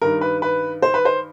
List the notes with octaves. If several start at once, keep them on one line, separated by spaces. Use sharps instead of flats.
G2 D#3 A#4
B4
B4
C5
B4
C5